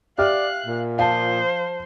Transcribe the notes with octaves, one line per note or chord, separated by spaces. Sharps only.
G4 D5 E5 F5 F6 F#6
A#2
F3 C5 F5 A5